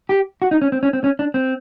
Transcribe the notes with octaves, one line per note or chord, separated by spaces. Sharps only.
G4
F#4
D#4
C#4
C4
C#4
C4
C#4
D4
C4